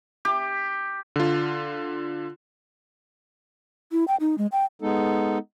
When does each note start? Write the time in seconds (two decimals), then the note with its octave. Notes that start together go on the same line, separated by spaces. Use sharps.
0.25 G4
1.16 D3 F4
3.92 E4
4.08 G5
4.20 D#4
4.38 G#3
4.52 G5
4.82 G#3 B3 D#4 A4